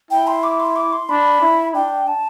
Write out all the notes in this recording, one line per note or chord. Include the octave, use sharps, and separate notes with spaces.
E4 G5
C6
D6
C6
D6
C6
D4 B5
E4
D4 G5
A5